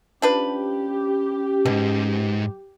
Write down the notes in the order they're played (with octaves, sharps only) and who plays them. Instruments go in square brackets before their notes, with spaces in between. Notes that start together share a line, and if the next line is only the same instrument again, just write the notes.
[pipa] F3 D4 B4 [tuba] C#4 [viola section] G4
[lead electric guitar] B1 G#2 [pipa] B2